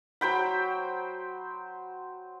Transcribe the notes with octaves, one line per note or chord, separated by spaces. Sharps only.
F#3 C5 G5 B5